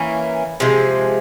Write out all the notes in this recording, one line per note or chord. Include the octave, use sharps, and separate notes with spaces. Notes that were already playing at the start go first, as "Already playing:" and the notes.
Already playing: E3 A#3 C#4
C3 F3 G#3